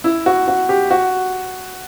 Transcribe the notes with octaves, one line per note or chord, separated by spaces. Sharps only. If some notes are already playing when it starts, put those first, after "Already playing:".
E4
F#4
F#4
G4
F#4